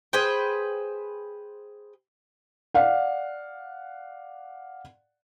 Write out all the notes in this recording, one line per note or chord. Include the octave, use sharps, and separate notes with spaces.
G#4 B4 C5 G5
D5 F5 F#5